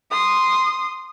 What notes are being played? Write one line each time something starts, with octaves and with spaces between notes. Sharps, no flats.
C6 D#6